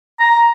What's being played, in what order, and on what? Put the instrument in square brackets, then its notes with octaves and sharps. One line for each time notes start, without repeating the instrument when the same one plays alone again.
[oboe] A#5